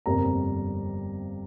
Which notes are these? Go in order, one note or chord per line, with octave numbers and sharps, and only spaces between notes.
G1 F2 C3 G3 A#3 A#4 A#5